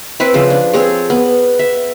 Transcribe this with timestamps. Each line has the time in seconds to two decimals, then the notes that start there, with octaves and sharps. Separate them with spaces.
0.20 C4 E4 B4 C5
0.34 C#3 F3
0.50 D4
0.73 C4 G#4 A4 C#5
1.10 B3
1.59 E5